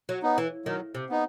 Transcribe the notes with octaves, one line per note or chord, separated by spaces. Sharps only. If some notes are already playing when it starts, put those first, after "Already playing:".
F#3
B3 D#4
E3
D#3 F#3
C3
B3 D#4